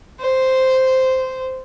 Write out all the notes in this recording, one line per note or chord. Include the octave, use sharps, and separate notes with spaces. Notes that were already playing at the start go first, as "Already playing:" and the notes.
C5